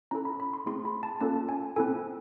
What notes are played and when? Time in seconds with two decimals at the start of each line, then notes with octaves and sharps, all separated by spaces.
0.11 C#4 E4 A4 A#5
0.25 B5
0.40 B5
0.53 C6
0.66 A3 C4 E4 G#4 C6
0.85 B5
1.03 A5
1.21 A#3 C#4 F4 A4 A5
1.49 G#5
1.76 C4 E4 A4 G#5